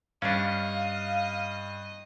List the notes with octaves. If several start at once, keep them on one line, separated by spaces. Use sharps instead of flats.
G2 C#4 D4 D#5 F5